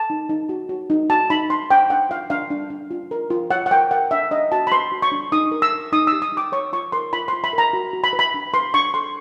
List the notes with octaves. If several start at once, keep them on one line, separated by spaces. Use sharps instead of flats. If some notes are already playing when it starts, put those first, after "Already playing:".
Already playing: A5
D#4
D#4
F#4
F#4
D#4
F#4 A5
D#4 B5
D#4 C6
D4 G5
D4 F#5
F4 F5
D4 F5
D4
D4
F4
A#4
F4
C#5 F#5
F#5
A#4 G5
A#4 F#5
D4 E5
D4 D#5
F#4 A5
B5
B4 C6
F#4
C#6
D4
D#4 D#6
A#4
E6
A#4
D#4 D#6
E6
G4
D#6
D#4
D6
C#5 C#6
F4 C#6
A#4 C6
F4 B5
F4 C6
B5
A#4
A#5
F#4
F#4
B5
B4
B5
D4
B4 C6
D4 C#6
A4 C6